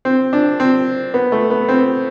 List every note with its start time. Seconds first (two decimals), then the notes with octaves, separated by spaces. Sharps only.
0.05 C4
0.33 D4
0.60 C4
1.14 B3
1.32 A3
1.50 B3
1.69 C4